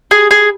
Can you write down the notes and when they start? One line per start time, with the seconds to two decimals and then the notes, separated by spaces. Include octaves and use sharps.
0.11 G#4
0.31 G#4